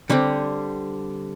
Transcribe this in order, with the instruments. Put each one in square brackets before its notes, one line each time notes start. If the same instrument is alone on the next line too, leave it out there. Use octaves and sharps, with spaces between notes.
[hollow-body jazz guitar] D3 G3 C4